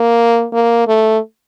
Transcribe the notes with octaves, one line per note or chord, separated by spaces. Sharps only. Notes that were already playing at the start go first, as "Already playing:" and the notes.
Already playing: A#3
A#3
A3